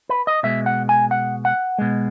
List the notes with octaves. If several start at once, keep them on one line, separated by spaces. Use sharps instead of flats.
B4
D#5
B2 G#3 E5
F#5
G#5
F#5
F#5
B2 G#3